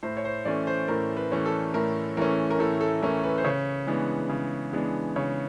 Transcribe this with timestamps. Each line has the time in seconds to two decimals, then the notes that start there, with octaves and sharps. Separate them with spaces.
0.03 A2 C5
0.17 C#5
0.25 C5
0.45 E3 A3 C#4 D5
0.67 C5
0.88 A2 A#4
1.17 B4
1.32 E3 A3 C#4
1.46 A4
1.74 A2 A#4
2.17 E3 A3 C#4 A#4
2.50 A#4
2.59 A2 A4
2.81 A4
3.02 E3 A3 C#4 A#4
3.23 B4
3.38 C5
3.44 C#3 C#5
3.87 E3 G#3 B3 D4
4.29 C#3
4.73 E3 G#3 B3 D4
5.16 C#3 C#5